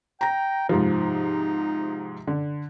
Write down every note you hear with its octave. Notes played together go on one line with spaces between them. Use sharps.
G5 A#5 A#6
G#2 C3 F3 D#4
D3